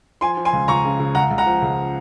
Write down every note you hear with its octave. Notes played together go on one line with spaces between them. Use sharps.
F3 G#5 C6
F3
G#5 C6
C#2
C#2 A#5 C#6
C#3
C#3
C#2 F#5 A#5
C#2
F#5 A#5
F3
C#2